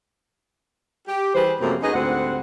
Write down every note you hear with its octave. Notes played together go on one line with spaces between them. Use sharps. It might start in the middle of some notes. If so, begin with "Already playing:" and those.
G4
E3 G3 G#4 B4 C5
F#2 C3 F3 A3 A#3
C#4 D#4 F#4 G#4 B4 D#5
D2 G#2 G3 C4 F#5